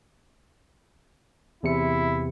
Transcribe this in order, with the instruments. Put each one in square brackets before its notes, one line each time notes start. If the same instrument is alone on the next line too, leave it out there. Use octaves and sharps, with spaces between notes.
[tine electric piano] E2 C3 C#7 [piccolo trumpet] E4